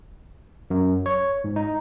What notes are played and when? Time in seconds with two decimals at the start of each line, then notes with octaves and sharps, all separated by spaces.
0.70 F#2
1.06 C#5
1.44 G#2
1.56 D#4